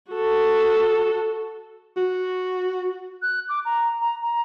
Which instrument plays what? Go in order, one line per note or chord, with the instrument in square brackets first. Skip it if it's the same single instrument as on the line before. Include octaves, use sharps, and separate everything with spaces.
[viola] F#4 A4
[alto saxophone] F#4
[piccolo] F#6
D6
A#5
A#5
A#5